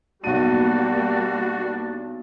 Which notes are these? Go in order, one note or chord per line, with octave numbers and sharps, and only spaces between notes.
B1 G3 A#3 D4 F#4 D#7